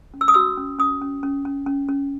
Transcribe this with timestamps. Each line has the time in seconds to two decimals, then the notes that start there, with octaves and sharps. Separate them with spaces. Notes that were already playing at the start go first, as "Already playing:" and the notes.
0.14 C#4
0.21 E6
0.28 D#6
0.34 F#4 E6
0.58 C#4
0.79 C#4 D#6
1.01 C#4
1.23 C#4
1.45 C#4
1.66 C#4
1.89 C#4